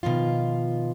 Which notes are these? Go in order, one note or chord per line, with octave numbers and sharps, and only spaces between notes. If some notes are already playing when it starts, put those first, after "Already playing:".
B2 D#3 F3 F4